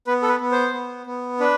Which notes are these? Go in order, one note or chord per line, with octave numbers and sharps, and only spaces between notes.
B3 B4
A4
B4
B3
C5
B3
B3
D4 B4